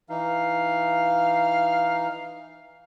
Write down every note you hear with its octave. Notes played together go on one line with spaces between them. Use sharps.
E3 D#4 F5